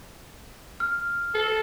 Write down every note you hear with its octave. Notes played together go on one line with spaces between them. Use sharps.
F6
A4